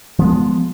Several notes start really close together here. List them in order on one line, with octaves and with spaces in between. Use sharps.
F3 B3 G#3